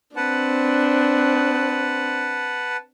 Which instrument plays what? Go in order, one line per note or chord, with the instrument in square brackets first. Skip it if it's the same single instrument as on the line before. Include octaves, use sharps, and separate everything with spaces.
[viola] C4 D4 [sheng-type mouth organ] B4 F#5 A5